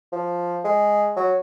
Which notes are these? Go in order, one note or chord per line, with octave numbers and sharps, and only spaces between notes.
F3
G#3
F#3